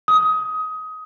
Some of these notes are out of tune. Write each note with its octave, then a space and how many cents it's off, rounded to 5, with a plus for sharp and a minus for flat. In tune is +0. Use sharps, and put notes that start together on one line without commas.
D#6 +20